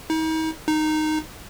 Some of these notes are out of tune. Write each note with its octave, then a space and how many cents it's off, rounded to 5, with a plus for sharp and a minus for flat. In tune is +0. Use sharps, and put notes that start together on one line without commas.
D#4 +40
D#4 -10